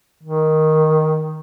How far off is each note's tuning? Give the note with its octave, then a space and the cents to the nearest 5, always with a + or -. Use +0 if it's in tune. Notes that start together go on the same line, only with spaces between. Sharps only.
D#3 +5